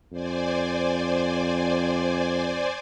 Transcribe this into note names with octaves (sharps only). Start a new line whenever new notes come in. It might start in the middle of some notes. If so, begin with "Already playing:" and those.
F2 C5 D5 G#5